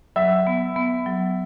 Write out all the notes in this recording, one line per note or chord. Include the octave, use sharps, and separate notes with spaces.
F#3 E5
B3
B3
F#3